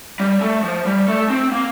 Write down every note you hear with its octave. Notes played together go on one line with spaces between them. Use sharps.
G3
A3
F3
G3
A3
C4
A#3